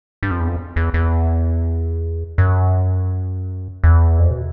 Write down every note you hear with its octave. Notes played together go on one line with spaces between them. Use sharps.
G2
F2
E2
F2
E2
E2
F#2
E2
F2
B2